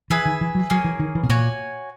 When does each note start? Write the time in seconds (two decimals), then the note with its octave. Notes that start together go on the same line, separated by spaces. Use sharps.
0.10 E3 G#4 B4 E5 G#5
0.25 D#3
0.41 E3
0.55 F#3
0.70 F#3 A#3 C#4 G#4
0.84 E3
0.99 D#3
1.15 E3
1.23 B2
1.29 A#2 F#4 C#5 G#5